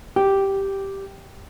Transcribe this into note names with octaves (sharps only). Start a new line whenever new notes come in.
G4